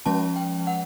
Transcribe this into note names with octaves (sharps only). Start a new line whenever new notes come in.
F3 G#3 C#4 A5
G5
F#5